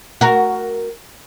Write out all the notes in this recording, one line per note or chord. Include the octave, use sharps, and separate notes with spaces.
F#4 A#4